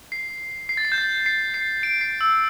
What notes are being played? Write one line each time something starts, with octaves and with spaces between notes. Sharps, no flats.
C7
C7
A6
C7
G6
A6
C7
C7
D7
C7
E6